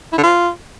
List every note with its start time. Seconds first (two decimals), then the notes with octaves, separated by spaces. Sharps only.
0.12 E4
0.18 D3
0.23 F4